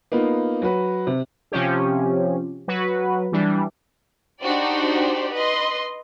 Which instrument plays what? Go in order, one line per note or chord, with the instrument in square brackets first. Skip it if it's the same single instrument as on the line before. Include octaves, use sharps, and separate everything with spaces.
[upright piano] A#3 B3 D#4 F4
F#3 F#4 B4
C3
[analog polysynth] C3 F3 C#4 G4
F#3 F#4 B4
E3 G3 D4
[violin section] D4 D#4 F#4 G4 C5 D5
B4 D#5 C6